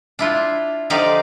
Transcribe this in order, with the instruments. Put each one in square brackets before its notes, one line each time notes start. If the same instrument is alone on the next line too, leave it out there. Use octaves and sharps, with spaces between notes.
[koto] D4 E4 F4
D3 F3 D#4 G4 D5 F5